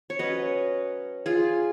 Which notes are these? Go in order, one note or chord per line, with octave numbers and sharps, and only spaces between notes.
C#5
F#3 C#4 B4 D#5
F4 G#4